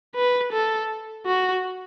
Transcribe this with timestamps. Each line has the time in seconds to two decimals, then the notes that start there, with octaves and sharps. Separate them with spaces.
0.16 B4
0.53 A4
1.26 F#4